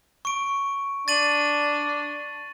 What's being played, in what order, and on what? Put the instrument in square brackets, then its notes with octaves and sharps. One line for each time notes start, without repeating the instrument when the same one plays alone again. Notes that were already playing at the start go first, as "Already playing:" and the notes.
[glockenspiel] C#6 D7
[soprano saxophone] D4 [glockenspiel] A6 D#7 F#7